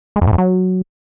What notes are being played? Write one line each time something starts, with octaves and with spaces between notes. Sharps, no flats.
G#3
F2
A2
F2
F#3